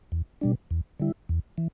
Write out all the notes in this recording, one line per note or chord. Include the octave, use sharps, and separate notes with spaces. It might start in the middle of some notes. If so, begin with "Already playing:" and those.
E2
B2 G3 D4
E2
D3 G3 E4
E2
E3